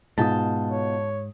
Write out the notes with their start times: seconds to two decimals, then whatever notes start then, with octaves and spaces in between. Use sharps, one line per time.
0.18 G#2 B2 F4 G5 A5 D#6
0.71 C#5